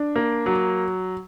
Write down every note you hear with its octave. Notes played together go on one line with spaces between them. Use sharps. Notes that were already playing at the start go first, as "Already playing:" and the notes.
Already playing: D4
A#3
F#3